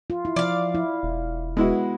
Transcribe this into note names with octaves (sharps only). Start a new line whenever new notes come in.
F4
E4
F3 D5 F5
E4
E1
G#3 B3 E4 F#4